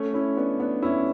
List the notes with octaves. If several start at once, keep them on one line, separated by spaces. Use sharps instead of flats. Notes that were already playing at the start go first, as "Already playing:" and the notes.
Already playing: A3 C#4
C#4 E4
B3 D4
B3 D4
C#4 E4